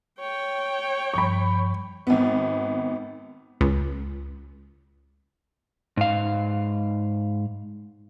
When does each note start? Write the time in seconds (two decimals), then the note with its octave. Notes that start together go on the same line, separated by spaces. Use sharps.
0.20 C#5 G5
1.14 G2 F3 G3 B5 C#6
2.07 G#1 B3
3.61 C#2
5.97 G#2 F5